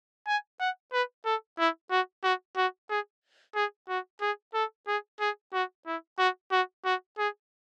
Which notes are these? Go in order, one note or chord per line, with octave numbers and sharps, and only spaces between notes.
G#5
F#5
B4
A4
E4
F#4
F#4
F#4
G#4
G#4
F#4
G#4
A4
G#4
G#4
F#4
E4
F#4
F#4
F#4
G#4